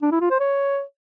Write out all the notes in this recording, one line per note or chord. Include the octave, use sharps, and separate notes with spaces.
D4
E4
F4
C5
C#5